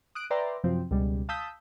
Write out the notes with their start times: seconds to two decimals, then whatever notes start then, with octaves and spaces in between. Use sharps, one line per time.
0.15 D#6 F#6 D7
0.30 B4 D5 E5 G5 A#5 C6
0.64 F#2 C3 F3 C4
0.91 C#2 B2 G3
1.29 F5 A5 D#6 E6 G6 B6